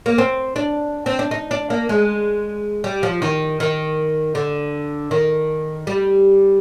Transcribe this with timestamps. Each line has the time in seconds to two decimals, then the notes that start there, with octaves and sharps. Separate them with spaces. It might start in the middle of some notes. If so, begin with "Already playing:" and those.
0.06 A#3
0.18 C4
0.56 D4
1.06 C4
1.19 D4
1.31 D#4
1.51 D4
1.70 A#3
1.89 G#3
2.84 G3
3.03 F3
3.22 D#3
3.60 D#3
4.35 D3
5.11 D#3
5.87 G3